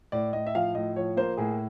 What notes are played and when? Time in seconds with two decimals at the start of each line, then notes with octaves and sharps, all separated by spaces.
0.12 A2 D5
0.33 A2 D#5
0.46 E5
0.55 F3 F5
0.75 A2 D#5
0.96 F3 C#5
1.17 A#3 C5
1.37 A2 G#4